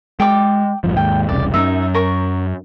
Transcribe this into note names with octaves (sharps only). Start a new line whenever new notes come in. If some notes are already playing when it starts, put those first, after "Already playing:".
G#3 G5 D6
A1 G2 F3
D#2 G#2 G5
E1 C2 C#3 D5
F#2 A3 C#4 D#4 E5
A#4 C#6